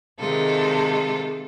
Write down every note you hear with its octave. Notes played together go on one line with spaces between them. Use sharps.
C3 D#3 G#3 F4 A4